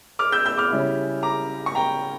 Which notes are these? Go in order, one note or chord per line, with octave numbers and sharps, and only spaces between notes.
D6 F6
E6 G6
E6 G6
D6 F6
C#3 G3 C#4 E4
A#5 D6
C#6
G5 A#5